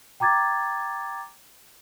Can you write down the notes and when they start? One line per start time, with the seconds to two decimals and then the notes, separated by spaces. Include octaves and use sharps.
0.20 G5 A#5 D6 G#6 A6